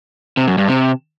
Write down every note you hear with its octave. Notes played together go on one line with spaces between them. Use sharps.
C3
F#2
G2
C3